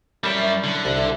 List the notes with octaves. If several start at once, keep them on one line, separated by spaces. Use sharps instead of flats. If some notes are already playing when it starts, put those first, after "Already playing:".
F#2 G3 E4 C#5 D5 E5 G5 C6
D3
C2 E5
E5